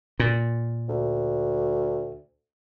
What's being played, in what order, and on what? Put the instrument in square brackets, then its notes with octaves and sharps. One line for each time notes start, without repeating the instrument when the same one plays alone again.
[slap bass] A#2
[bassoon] D2